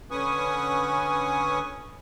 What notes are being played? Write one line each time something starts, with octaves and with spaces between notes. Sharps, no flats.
D3 C#4 B4 G#5 C#6 D#6